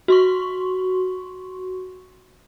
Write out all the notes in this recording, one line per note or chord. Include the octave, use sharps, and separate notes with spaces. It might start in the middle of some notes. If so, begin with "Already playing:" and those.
F#4 C6 C#6